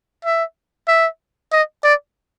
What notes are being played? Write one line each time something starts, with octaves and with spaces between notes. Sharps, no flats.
E5
E5
D#5
D5